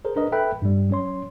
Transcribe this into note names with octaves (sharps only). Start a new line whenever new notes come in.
G#4 A#4 C5
D4 A#4 B4 D#5
A4 B4 E5 G5 B5 F#6
G2 G3
F#3 C#4 C#5 C6